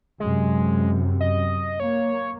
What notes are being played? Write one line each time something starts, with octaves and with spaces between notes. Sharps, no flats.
F#2 C3 G#3
D#5
A#3 C#5